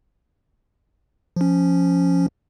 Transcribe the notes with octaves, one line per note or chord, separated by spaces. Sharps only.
F3 C#4